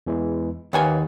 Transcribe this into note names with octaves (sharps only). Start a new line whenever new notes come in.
E2 E3 G#3
D#2 A#3 B4 C#5 F#5 G#5